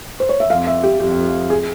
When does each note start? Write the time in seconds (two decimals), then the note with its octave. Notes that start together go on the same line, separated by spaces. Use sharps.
0.20 C5
0.29 C#5
0.40 E5
0.50 F2 F5
0.67 E5
0.83 G4
1.00 F2 G4
1.50 G#4